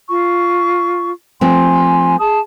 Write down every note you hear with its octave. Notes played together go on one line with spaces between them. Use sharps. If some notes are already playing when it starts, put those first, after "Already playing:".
F4 C#6
F3 A3 C4 G#5 C6
G#4 A5 D#6